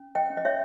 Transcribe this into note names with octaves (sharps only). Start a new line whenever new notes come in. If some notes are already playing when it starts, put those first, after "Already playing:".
Already playing: C#4
D#5 G5
C#4
D#5
C#5 E5